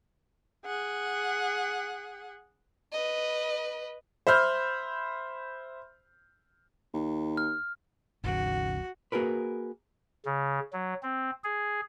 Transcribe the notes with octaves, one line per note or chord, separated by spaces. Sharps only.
G#4 F#5
B4 D#5
C5 E5 B5 F6 G6
D#2
F6
G#1 D#2 G#2 C#3 F3 F#4
A#3 F#4 G#4 A#4 B4
C#3
F#3
C4
G#4